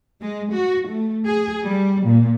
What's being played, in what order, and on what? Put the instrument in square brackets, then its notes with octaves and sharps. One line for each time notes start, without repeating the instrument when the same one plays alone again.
[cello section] G#3
F#4
A3
G#4
G3
A#2